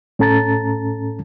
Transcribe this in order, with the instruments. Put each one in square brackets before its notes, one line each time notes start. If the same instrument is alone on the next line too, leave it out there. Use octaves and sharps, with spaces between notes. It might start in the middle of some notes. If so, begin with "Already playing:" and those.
[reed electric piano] A2 C#4 A4 A5 A#5 A6